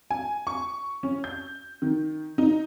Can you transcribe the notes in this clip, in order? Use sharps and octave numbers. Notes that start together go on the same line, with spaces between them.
G#5
C#6
C#4
G6
D#3
D#4